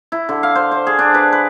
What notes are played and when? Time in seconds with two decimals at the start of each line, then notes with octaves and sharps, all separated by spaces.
0.12 E4
0.29 D3
0.43 F5
0.55 C5
0.71 C5
0.87 G#4
0.99 D4
1.14 B4
1.33 B4